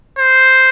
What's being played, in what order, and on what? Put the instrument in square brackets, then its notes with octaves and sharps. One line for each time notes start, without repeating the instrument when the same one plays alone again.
[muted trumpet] C5